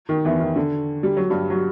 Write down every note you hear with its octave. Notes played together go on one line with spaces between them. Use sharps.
D#3
E2 E3
D#3
D3
G3
F#3
G2 G3
F#3